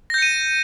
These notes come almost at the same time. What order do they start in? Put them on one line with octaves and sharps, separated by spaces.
A#6 G6 C#7 D#7 E7